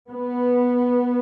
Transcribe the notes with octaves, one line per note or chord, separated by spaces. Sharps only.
B3